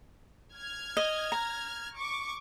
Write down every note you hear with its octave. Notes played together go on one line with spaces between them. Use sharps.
F6 G#6
D#5
A#5
C#6 D6